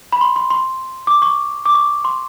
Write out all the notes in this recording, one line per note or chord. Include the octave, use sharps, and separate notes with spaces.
B5
C6
C6
C6
D6
C#6
D6
C#6
C6